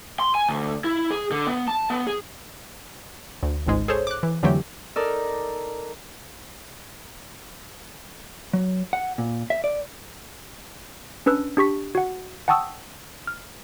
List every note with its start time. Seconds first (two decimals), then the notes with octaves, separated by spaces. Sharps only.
0.19 C6
0.35 G#5
0.49 D2
0.84 E4
1.11 G#4
1.31 D3
1.47 B3
1.68 A5
1.90 B3
2.07 G#4
3.43 D2
3.67 G#1 C#2 G#2 G#3
3.88 G#4 A4 C5 C#5
4.07 D6 F#6
4.23 E3
4.43 F2 D3 E3 F#3 A3 G4
4.96 D#4 A4 A#4 D5
8.53 F#3
8.93 F#5
9.18 A#2
9.50 E5
9.64 D5
11.26 C#4 D4 B4 E6 F#6
11.57 D4 G4 C#6 B6
11.95 F#4 F#5
12.48 F#5 G5 A5 C#6 D#6 E6
13.27 F6